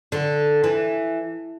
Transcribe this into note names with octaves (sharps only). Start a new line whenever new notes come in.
D3
E3